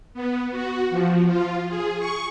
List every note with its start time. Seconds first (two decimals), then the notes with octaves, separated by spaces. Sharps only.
0.14 B3
0.51 F#4
0.90 F3
1.27 F4
1.69 G#4
1.99 C#6